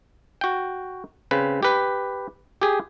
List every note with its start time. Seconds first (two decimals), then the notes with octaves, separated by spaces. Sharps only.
0.41 F#4 G5
1.31 C#3 C4 B4
1.63 G4 B4
2.62 G4 G#4